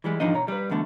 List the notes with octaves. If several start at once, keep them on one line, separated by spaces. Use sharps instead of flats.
E3 G3 G#3
E2 G#2 F3 D4 D#4 D#5
B2 C#5 A#5
G3 B4
B1 E2 B2 D3 G#3 A3